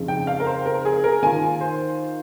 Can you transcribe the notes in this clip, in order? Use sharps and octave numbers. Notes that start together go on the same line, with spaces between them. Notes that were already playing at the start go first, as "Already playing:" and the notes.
Already playing: F2 C#3 G#3 D#4
G5
F5
A#4
C5
A#4
G#4
A#4
D#3 A#3 F4 G#5
C5